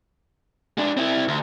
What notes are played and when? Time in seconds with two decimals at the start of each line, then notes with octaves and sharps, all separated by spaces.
0.78 G#3 D4
0.97 C4 E4
1.28 D2